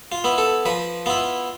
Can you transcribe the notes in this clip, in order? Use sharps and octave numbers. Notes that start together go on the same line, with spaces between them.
F4
B3 E4
A4
F3 B4
B3 E4 F4